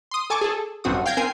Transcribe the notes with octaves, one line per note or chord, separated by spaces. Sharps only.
C6 D#6
A4 G#5 A5 C#6 D6
G#4 A4
G1 F#2 C4 F#4 D#6
F5 G5 G6 G#6 A#6
C4 A#4 G5 G#5 C7